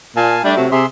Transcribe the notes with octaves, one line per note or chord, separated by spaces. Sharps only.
A#2 F5 G#5 A5
G3 A3 D4
C3 F#3
C3 G#4 E5 C6